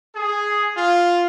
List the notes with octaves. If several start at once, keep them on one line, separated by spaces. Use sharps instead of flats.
G#4
F4